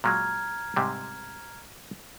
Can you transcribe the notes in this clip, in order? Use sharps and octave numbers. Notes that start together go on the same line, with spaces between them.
A#2 F#3 G#3 A#5 F6 G#6
G#2 C3 G3